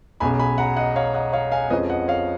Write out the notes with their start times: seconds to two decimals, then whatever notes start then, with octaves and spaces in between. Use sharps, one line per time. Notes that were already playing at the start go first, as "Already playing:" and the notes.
0.20 B1 B2 G#3 C#4 G#5 B5
0.39 G#5 B5
0.58 F#5 A#5
0.77 D#5 F#5
0.96 C#5 F5
1.14 D#5 F#5
1.33 C#5 F5
1.51 F5 G#5
1.70 F2 F3 G#3 C#4 B4 D#5
1.90 D#5 F#5
2.08 C#5 F5